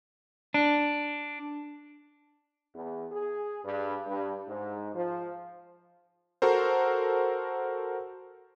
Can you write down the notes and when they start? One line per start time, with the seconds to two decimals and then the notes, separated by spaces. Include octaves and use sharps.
0.54 D4
2.74 E2
3.11 G#4
3.64 G2
4.06 G2
4.48 G#2
4.94 F3
6.42 F#4 A4 A#4 C5